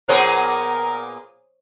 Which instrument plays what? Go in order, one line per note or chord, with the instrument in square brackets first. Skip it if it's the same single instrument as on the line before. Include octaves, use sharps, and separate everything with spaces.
[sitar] A#2 B3 G#4 [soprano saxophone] A#4 [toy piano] C5 C#5 C#6